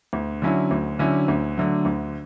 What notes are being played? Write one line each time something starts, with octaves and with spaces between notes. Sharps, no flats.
D2
D3 F#3 C#4 E4
D2
D3 F#3 C#4 E4
D2
D3 F#3 A3
D2